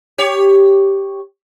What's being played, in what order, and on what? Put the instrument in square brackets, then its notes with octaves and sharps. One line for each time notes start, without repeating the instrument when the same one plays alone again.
[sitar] G4 C#5